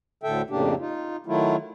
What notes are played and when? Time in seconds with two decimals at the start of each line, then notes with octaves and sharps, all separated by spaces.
0.23 D2 A2 D3 A4 E5 G5
0.50 F2 A2 C#3 A#3 D4 G4
0.79 D#4 F4
1.26 D#3 F#3 A3 E4 F4